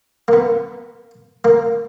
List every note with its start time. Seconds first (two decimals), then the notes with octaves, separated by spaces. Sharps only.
0.28 A#3
0.33 B3
1.45 A#3